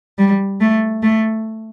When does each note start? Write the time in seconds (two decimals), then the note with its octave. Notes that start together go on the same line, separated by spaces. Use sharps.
0.18 G3
0.61 A3
1.03 A3